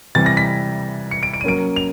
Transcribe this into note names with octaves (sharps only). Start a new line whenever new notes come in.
C3 E3 G3 A6
A#6
B6
C#7
D7
D7
D#7
F#3 A#3 C#4 D7
F7